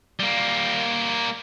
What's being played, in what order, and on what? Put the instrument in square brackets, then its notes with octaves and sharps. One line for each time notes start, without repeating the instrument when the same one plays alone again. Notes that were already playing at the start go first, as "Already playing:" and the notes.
[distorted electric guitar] G3 A#3